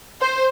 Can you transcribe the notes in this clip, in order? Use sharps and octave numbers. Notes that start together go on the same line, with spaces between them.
C5